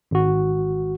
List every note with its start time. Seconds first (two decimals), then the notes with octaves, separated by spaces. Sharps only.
0.11 G#1 F#4